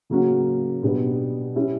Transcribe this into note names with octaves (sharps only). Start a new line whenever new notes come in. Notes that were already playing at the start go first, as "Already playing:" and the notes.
C#3 F#3 A#3 C#4 F#4
B2 G3 B3 D4
G3 C#4 E4